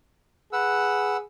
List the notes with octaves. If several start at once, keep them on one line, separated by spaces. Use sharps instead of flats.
G#4 B4 F#5 E6